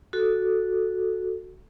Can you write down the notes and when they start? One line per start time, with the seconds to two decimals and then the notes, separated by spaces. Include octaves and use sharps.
0.13 F#4 A4